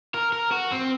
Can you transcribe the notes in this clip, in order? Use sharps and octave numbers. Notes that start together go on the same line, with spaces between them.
A#4
A#4
F#4
C4